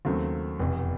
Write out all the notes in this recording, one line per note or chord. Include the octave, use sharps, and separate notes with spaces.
D#2 C#3 F#3 A3 C4
F1 E2 B2